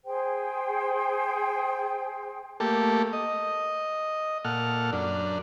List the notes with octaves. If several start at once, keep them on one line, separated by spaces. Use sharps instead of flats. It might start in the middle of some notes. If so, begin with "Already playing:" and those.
G#4 C5 G5
A3 A#3 G4 A4
D#5
A#2 A4 F#5 F6
F#2 D4